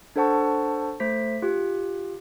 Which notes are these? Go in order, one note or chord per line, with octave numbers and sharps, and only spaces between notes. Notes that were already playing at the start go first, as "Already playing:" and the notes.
D4 A4 C5 F#5 A5 C#6
A3 C5 B6
F4 G4